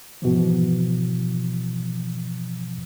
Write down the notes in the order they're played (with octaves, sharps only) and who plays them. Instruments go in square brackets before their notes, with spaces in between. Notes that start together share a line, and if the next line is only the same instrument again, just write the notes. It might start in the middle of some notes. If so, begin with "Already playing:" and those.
[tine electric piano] G#2 B2 E3 F3